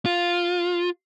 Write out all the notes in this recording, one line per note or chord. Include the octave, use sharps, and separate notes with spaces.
F4